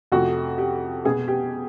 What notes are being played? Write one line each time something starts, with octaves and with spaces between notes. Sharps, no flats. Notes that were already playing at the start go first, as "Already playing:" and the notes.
F2 C3 F3 A3 F#4
G4
B2 G#3 B3 G#4
G4